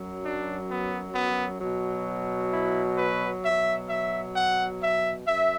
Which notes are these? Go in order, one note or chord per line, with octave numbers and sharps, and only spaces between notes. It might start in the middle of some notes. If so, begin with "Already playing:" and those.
Already playing: F#2 F#3
D4
B3
B3
B2 F#3
E4
B4
B2 F#3 E5
E5
F#5
E5
F#2 E5